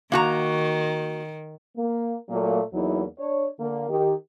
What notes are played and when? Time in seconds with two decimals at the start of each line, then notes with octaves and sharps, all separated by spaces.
0.12 D#3 A#3 F#4 A#5
1.77 A#3
2.29 A#2 F#3 A3 A#3
2.73 E2 F#3 A#3 D#4 E4
3.19 D4 C#5
3.59 D3 A#3
3.89 D#3 G4